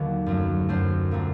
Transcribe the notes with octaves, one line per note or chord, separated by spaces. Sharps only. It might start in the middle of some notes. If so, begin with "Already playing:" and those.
Already playing: D#2 D3 F#3 A#3 A5
F#2 F#3 A3
F#2 F#3 A3 C5
A#2 F#3 A3 C4